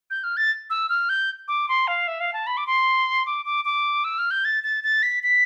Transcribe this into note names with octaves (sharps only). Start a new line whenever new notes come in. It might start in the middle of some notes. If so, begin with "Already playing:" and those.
G6
F6
A6
E6
F6
G6
D6
C6
F5
E5
F5
A5
B5
D6
C6
D6
D6
D6
E6
F6
G6
A6
A6
A6
B6
B6